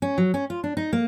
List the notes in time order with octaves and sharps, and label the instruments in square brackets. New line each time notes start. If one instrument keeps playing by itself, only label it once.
[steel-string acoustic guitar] C#4
F#3
C#4
F4
D4
D#4
A#3